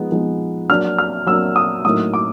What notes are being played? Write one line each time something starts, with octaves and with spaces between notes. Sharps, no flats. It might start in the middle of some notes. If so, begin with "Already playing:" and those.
Already playing: F3 G#3 B3 D#4
F3 G#3 B3 D#4
F#3 A#3 D4 F6
F6
F#3 A#3 D4 E6
D#6
A2 F#3 A#3 D#4 D#6
D6